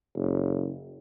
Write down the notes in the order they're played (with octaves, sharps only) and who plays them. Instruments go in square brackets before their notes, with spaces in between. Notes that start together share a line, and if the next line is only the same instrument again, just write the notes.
[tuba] F#1